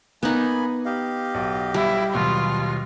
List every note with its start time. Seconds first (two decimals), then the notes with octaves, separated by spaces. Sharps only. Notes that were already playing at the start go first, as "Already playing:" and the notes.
0.23 A#3 B3 D#4 G#5 B5
0.85 G4 D#5 F5
1.34 B1
1.74 G3 E4
2.14 D#2 B2 F#3 F4